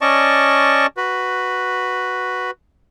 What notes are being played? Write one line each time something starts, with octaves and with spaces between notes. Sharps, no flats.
C#4 D5 D#5 A5 C#6
F#4 B4